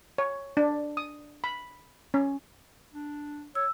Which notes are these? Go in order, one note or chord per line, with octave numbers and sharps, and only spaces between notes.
C#5
D4
D#6
B5
C#4
D4
C#5 E6